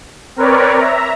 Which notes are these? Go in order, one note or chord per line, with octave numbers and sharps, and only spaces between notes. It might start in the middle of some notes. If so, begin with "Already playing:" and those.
C4 A#4 B4 C#5 D5
E5 A#5